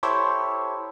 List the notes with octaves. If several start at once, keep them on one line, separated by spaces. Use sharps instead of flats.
E4 G4 A4 C5 C#5